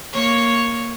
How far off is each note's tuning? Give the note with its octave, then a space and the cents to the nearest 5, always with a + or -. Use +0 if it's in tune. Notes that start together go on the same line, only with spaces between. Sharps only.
A#3 +0 C#5 +0